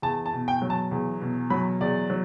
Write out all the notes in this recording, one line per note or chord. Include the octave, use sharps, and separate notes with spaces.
E2 A5
A5
B2
G5
F#3
A5
E2
B2
F#3 B5
E2 D5
F#3